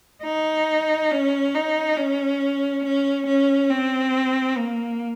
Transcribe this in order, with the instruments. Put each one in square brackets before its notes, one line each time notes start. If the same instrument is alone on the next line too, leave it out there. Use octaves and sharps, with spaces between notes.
[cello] D#4
C#4
D#4
C#4
C#4
C#4
C4
A#3